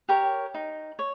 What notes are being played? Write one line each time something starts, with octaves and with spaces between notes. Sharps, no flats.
G4 A#4 C#5
D#4
C#5